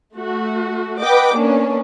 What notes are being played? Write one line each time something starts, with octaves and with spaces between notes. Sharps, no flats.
A3 F#4
B4 D#5 F#5 G5 D6
A#3 B3 C#4 D4